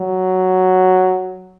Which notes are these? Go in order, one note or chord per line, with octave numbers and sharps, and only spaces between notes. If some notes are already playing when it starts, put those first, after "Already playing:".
Already playing: F#3